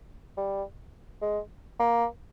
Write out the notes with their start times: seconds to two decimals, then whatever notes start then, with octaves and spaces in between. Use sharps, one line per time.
0.37 G3
1.22 G#3
1.79 A#3